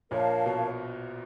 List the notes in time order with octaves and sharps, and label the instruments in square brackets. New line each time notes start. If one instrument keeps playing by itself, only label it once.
[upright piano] A#1 A#2 [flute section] A#4 C#5 F5 A5
[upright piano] B2